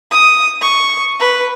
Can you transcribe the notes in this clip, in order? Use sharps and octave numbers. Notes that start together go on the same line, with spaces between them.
D#6
C#6
B4